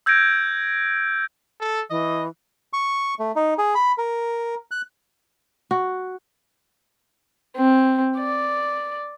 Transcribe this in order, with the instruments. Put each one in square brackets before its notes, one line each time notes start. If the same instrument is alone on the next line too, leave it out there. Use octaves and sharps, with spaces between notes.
[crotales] E6 G6 G#6 A#6 D7
[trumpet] A4
[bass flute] E3 [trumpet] D#5
[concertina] C#6
A3
D#4
G#4
B5
A#4
F#6
[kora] F#4
[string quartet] C4
D5